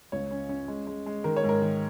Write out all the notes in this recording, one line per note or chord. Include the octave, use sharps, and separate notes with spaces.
C#2 C#5
C#4
C#4
G#3
G#3
G#3
D#3 A#4
C#5
G#2
A#4
D#3